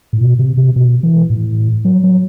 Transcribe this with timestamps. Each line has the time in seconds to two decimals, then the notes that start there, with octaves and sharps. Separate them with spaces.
0.13 A2
0.21 B2
0.39 C3
0.57 C3
0.76 B2
1.03 E3
1.30 A2
1.85 F#3
2.04 F#3